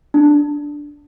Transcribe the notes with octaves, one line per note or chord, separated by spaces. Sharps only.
D4